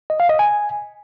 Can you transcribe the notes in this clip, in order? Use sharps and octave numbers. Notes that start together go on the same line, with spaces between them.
D#5
F5
D#5
G#5